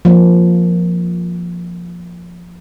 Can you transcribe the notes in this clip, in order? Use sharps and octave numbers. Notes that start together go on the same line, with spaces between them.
F3 A#3